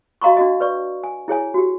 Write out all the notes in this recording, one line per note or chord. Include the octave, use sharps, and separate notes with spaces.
F#4 D#5 F5 A#5 C6 C#6
D4 F#4 D#5
B4 D5 C#6
G#5
E4 G#4 C#5 G#5
F#4 G4